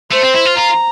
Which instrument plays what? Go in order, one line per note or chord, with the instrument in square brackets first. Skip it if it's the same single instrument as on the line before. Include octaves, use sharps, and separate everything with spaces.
[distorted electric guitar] A3 [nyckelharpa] C5
[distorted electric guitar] C4
E4
F4
[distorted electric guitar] F4 [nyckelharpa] A#5